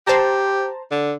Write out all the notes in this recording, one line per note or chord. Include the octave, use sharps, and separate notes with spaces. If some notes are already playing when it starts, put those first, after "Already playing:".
G4 C5 A5 A#5
D3